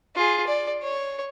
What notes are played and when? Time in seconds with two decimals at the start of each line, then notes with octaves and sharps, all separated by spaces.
0.15 F4 G#4
0.47 D5
0.82 C#5